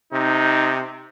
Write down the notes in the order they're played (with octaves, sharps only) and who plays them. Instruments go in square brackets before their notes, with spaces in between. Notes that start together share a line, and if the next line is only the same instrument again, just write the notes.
[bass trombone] C3 [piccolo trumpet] D#4